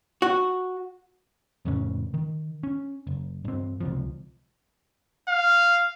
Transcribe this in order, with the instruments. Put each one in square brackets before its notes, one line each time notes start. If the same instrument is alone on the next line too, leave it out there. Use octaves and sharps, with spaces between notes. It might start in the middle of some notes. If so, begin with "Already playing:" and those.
[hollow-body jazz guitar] F#4
[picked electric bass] F2 A2 C#3 C#4
D#3
C#4
F#1
G2 C4
C#2 C3 F3
[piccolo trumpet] F5